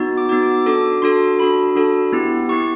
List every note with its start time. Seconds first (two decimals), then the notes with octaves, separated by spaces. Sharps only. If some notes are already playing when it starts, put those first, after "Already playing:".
Already playing: B3 D#4 F#4
0.17 D6
0.29 B3 D#4 F#4
0.43 D6
0.66 D4 F#4 A4 D6
1.02 D4 F#4 A4 C6
1.39 D4 F#4 A4 B5
1.76 D4 F#4 A4
2.13 B3 E4 G4
2.49 B3 E4 G4 C#6